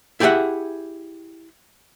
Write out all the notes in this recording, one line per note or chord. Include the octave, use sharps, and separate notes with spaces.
E4 G4 G#4 D5 E5 F#5